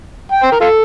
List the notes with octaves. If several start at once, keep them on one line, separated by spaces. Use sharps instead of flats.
G5
C5
A#4
F4 A4